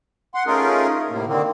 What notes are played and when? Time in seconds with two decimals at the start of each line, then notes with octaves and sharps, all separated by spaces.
0.35 F#5 C6
0.47 A3 C#4 D#4 F4 G#4 A#4
1.10 A2 C3 A#3
1.27 D3 D#3 A#3 C4